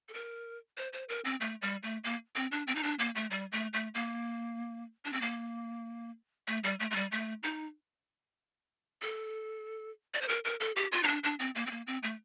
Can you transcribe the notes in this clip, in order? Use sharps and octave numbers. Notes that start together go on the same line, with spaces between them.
A4
A#4
C5
C5
A#4
C4
A3
G3
A3
A#3
C4
D4
C4
D#4
D4
A#3
A3
G3
A3
A3
A#3
D4
C4
A#3
A3
G3
A3
A3
G3
A3
D#4
A4
D5
C5
A#4
A#4
A4
G4
F4
D#4
D4
D4
C4
A#3
C4
A#3
C4
A3